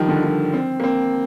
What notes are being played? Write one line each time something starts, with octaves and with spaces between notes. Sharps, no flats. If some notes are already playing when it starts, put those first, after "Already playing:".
Already playing: D#3 F3 G3
D3
D#3
C4
A#3
C4